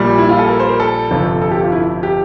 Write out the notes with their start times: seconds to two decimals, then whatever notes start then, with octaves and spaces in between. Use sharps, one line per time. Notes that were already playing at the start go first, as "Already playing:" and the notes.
Already playing: A#1 A#2 G3
0.18 E4
0.29 F4
0.39 A4
0.49 A#4
0.60 C5
0.69 A#4
0.80 A4
1.11 G1 F2 C3 F3
1.41 A4
1.51 G4
1.62 F4
1.72 E4
2.03 G4